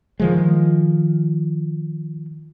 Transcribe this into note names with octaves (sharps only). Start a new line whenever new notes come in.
D#3 F3 G#3